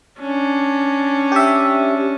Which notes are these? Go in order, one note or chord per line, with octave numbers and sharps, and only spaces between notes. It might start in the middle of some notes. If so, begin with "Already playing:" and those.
C#4 D4
G4 E5